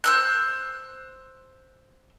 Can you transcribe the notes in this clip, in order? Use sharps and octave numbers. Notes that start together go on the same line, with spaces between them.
C5 E6 F#6